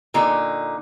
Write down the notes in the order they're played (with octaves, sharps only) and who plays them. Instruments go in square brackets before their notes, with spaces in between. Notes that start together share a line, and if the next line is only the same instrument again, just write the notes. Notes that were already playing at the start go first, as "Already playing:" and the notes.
[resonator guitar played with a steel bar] A#2 D3 D#4